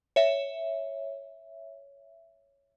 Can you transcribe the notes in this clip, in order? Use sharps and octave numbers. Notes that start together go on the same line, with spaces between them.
C#5 E5